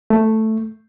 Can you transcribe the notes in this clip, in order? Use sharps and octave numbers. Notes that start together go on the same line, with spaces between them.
A3